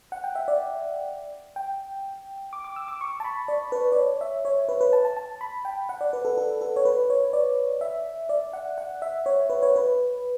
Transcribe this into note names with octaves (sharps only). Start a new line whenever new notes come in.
F#5
G5
E5
D5
G5
D6
D6
E6
D6
C#6
A5
B5
D5
B4
D5
C#5
E5
C#5
B4
B4
A5
A5
A5
B5
G5
F#5
D5
B4
A4
A4
A4
C#5
B4
C#5
D5
E5
D5
F#5
F#5
E5
C#5
B4
C#5
B4